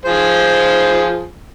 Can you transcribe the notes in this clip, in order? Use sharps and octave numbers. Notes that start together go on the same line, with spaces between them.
F3 G#4 C5